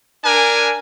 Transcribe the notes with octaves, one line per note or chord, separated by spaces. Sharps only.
D4 A#4 G#5